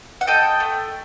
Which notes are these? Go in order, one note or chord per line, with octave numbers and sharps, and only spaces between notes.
F#5
A4 D#5 G5
A3